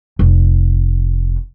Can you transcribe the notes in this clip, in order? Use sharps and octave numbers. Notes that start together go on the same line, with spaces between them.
F1